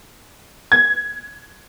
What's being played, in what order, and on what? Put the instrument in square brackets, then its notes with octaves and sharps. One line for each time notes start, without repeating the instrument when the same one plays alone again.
[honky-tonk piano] G#6